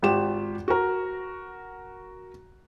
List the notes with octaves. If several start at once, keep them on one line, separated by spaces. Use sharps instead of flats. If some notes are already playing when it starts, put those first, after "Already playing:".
G#1 F4 G4 E7
F#4 A#4